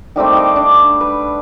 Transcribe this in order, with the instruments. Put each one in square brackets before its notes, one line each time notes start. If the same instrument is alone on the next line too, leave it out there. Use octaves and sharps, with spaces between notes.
[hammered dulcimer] D#3 G3 A3 C4
D#5 F5 C#6 D6
D4
B4